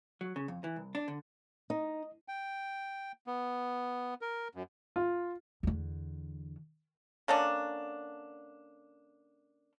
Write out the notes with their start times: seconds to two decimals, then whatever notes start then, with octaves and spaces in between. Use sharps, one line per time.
0.21 F#3
0.36 C#3
0.48 F2
0.64 E3
0.76 C2
0.95 D4
1.08 D3
1.70 D#4 D#5
2.28 G5
3.27 B3
4.21 A#4
4.55 F#2
4.96 F4
5.63 E2 D3
7.28 D3 A#3 C#4 D4